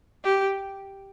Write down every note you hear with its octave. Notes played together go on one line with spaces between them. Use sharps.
G4